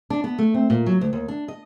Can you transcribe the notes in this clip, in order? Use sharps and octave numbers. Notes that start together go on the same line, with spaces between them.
D4
B3
A3
C4
A#2
F#3
D2
D#2
D4
D#5